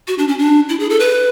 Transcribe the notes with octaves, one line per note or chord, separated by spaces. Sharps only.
F#4
D4
C#4
D4
E4
G#4
A4
B4